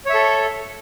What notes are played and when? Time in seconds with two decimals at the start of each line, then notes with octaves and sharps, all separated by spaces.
0.06 C#5
0.10 E5
0.14 A4